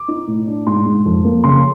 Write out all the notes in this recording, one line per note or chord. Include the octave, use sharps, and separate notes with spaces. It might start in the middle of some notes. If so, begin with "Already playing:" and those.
Already playing: D6
D#4
A2
D4
G#2 C6
G#2
F2
A#3
C#3 C6